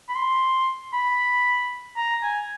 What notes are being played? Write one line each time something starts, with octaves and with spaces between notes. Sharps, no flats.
B5
C6
B5
A#5
G#5